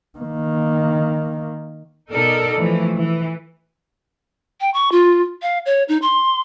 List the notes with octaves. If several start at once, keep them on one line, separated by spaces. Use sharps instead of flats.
D#3 A#3
B2 D#4 A4 A#4 D5
E3 F3 A3
E3
G5
C#6
F4
F5
C#5
D#4
C6